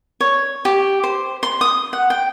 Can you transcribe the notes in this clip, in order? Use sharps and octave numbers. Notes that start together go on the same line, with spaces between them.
C#5
G4
C5
C6
D#6
F#5
G5